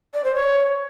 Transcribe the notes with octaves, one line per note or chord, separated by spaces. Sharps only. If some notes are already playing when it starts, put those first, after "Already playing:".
D5
C5
C#5